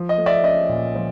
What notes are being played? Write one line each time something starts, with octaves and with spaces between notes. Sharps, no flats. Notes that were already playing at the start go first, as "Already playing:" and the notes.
Already playing: F3
D#5
A3
D5 E5
C#4 D#5
A#2
F3